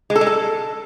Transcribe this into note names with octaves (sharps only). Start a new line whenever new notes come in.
G#3
A4
G#3
A4